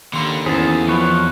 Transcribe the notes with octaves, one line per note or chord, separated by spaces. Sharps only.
D#2 D3 B5 C6 C#7
E2 C#4 E4 G#4 A4 C5 A5
F2 F3 B4 C#5